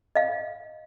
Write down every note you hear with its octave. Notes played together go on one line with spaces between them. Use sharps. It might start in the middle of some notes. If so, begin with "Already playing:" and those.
D#5 F5